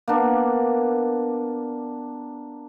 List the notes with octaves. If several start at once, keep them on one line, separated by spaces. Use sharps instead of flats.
A#3 B3 D4